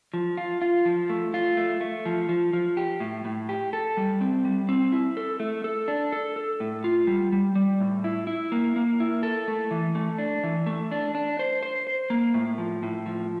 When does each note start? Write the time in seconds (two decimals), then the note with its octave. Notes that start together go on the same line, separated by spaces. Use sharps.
0.14 F3
0.38 F4
0.62 F4
0.85 F3
1.10 A3
1.34 F4
1.57 A3
1.81 A3
2.06 F3
2.29 F3
2.53 F3
2.77 G4
3.00 A2
3.25 A2
3.49 G4
3.73 A4
3.97 G3
4.21 C4
4.45 G3
4.69 C4
4.92 E4
5.17 A4
5.40 A3
5.64 A4
5.88 D4
6.12 A4
6.36 A4
6.60 A2
6.84 F4
7.07 G3
7.32 G3
7.56 G3
7.80 A2
8.04 E4
8.27 E4
8.52 A#3
8.76 A#3
9.00 E4
9.23 A4
9.48 A3
9.71 E3
9.95 A3
10.18 D4
10.43 E3
10.66 A3
10.91 D4
11.15 D4
11.39 C5
11.63 C5
11.87 C5
12.10 A#3
12.34 A2
12.58 F3
12.83 A2
13.06 F3